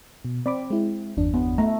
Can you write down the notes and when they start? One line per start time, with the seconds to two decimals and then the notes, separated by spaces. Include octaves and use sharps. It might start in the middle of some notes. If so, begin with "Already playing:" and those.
0.25 B2
0.46 C4 D5 B5 D6
0.70 G#3 E4
1.17 G1 E2 D4
1.34 B3
1.58 A3 A#5